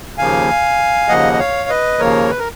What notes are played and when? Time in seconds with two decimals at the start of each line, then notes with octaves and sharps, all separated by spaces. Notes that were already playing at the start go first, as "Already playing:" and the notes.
0.18 D#2 C#3 F3 A#3 F5 G#5
1.08 D#2 C#3 F3 A#3 D#5 F#5
1.33 D#5
1.39 C#5 F5
1.69 B4 D#5
1.99 D#2 C#3 F3 A#3 A#4 C#5
2.30 B4
2.39 A#4